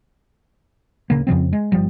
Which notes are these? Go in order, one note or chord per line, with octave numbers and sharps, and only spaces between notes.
D1 C#3 A#3
F2 C#3 F3 C4
G#3
G1 F3 G3